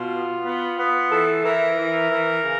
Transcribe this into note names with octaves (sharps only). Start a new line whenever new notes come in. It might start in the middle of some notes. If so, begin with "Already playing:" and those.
Already playing: B2 F4
B3
B3
B3
E3 A4
E3 A#4
E3
E3
C#3